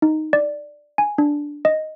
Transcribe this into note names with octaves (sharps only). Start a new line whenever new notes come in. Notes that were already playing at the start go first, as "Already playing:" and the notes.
D#4
D5
G#5
D4
D#5